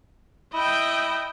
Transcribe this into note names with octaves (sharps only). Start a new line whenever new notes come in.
E4 D#5 G5